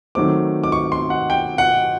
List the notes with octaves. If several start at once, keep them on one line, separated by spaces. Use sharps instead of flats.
D#3 F#3 A3 C4 D6
D6
C#6
C6
F#5
G5
F#5